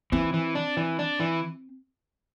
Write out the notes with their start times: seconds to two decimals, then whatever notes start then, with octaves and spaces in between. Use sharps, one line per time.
0.12 E3 C4
0.34 E3
0.55 D4
0.77 E3
0.99 D4
1.20 E3